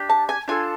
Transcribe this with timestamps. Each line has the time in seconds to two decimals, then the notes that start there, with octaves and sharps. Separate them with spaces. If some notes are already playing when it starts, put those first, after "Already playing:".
Already playing: D4 G4
0.10 A5
0.29 G#5
0.48 D4 F4 A4 G#5